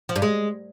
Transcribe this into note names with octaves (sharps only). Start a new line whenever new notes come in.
F3
G2
G#3